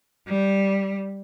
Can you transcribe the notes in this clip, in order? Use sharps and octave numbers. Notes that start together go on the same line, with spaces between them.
G3